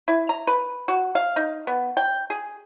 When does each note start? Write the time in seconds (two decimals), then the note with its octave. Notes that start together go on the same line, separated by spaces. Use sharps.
0.08 E4
0.29 A#5
0.47 B4
0.88 F#4
1.15 F5
1.36 D#4
1.67 B3
1.97 G5
2.30 G#4